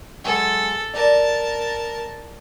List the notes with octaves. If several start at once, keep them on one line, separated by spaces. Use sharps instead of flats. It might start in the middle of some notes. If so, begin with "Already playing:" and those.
F#3 G#3 A4 G#5
A#4 D5 A5